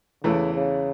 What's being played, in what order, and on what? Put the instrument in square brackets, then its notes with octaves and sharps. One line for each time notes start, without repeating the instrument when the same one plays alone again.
[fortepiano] E2 E3 A3 E4 [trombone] C#3
[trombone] C#3